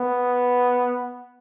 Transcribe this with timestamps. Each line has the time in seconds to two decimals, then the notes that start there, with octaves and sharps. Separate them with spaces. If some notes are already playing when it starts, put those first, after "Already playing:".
Already playing: B3